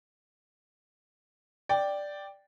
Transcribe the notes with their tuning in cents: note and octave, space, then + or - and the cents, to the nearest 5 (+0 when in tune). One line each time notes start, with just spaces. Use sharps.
D5 +0 G5 +0